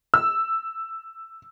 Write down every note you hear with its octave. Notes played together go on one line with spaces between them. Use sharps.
E6